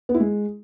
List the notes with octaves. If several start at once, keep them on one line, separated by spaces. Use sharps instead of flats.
B3
E4
G#3